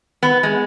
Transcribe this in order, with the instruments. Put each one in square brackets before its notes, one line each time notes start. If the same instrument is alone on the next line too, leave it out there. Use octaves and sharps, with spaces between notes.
[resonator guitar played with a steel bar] B3
G#3